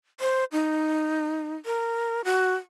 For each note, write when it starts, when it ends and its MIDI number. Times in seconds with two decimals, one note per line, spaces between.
0.20 0.44 72
0.52 1.55 63
1.65 2.21 70
2.25 2.54 66